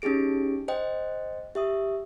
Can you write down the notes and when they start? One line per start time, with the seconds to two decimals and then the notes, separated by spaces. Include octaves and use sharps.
0.02 C#4 D#4 G4 G#4 D7
0.68 C5 D#5 G5
1.55 G4 E5 D#6